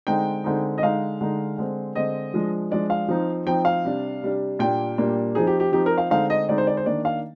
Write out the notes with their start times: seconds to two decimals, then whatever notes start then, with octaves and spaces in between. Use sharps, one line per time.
0.07 D3 G#3 C4 D#4 G5
0.44 D3 G#3 C4 D#4
0.78 D#5
0.83 D3 G#3 D#4 F5
1.21 D3 G#3 D#4
1.58 D3 G#3 C4
1.95 D3 G#3 C4 D#5
2.34 F3 G#3 D4
2.71 F3 G#3 D4 D5
2.90 F5
3.08 F3 C4 D#4
3.46 F3 C4 D#4 G5
3.65 F5
3.85 C3 G3 D4
4.22 C3 G3 D4
4.59 A#2 G3 A#3 D4 G5
4.98 A#2 G3 A#3 D4
5.35 F3 C4 D#4 G#4
5.47 G4
5.60 G4
5.72 F3 C4 D#4 G4
5.86 A#4
5.98 F5
6.10 D3 G#3 C4 D#4 F5
6.30 D#5
6.49 D3 G#3 C4 D#4 D5
6.58 C5
6.67 D5
6.77 C5
6.85 D#3 A#3 D4 D5
7.05 F5